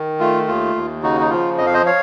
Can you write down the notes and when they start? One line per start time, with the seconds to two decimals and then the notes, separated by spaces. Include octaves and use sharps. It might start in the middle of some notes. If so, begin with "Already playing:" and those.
Already playing: D#3
0.20 A3 F4
0.48 D#2 F4
0.75 D#2
1.03 C#3 D#4 F#4
1.21 D#4
1.30 F3 F4
1.58 F2 D#5
1.66 F5
1.74 C5 D#5
1.86 C#5 F5